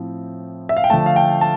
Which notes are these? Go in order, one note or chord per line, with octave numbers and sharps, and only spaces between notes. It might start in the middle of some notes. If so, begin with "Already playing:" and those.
Already playing: A2 F3 C4
E5
F5
G5
D3 F3 A3 A5
F5
G5
A5